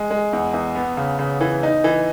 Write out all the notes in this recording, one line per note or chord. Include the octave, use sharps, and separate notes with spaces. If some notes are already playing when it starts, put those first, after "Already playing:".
Already playing: G#3
G#3
E2
E2
B3
C#3
C#3
E3
D#4
E3